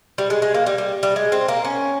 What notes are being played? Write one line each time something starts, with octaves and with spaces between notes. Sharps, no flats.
G3
G#3
G#3
A#3
G3
G3
G3
G#3
C4
A#3
C#4